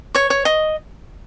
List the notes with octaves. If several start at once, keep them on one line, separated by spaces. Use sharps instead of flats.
C#5 C#6
C#5
D#5